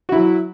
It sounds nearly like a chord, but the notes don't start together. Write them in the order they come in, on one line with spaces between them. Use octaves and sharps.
F#4 E4 F#3